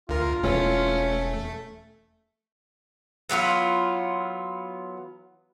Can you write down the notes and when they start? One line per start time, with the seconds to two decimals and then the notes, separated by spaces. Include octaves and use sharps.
0.09 D2 F4 A#4
0.44 E1 A3 C#4
3.29 E3 F#3 B3 F4